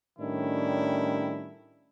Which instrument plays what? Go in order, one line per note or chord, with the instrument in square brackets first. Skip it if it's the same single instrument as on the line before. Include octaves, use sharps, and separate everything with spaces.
[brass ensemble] A2 D#3 G3 C#4 D4 E4